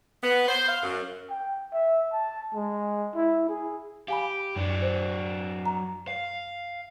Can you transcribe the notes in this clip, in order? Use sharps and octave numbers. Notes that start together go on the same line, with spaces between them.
B3
C5
F5
F#2
G5
E5
A5
G#3
E4
G#4
G4 F5 G#5 B5
F#2 F#3 D4
C5
A#5
F5